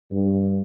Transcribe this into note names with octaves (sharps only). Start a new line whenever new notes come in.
G2